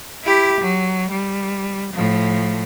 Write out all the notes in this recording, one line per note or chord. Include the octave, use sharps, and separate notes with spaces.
E4 G4
F#3
G3
A2 F3